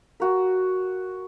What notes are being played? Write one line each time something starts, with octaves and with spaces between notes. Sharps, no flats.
F#4 A#4